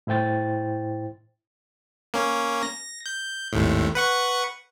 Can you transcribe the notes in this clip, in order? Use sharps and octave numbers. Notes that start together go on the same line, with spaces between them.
A2 E4 C5 G5 A6
A#3 C#4
A#6
G6
G#1 D#2 A2
B4 F#5 C#6